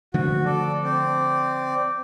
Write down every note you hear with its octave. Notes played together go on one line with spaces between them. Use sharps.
D3 F3 A3 F#4
A4 D5
C4 D5